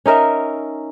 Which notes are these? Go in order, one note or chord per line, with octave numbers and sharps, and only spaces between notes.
C#4 D#4 A#4 E5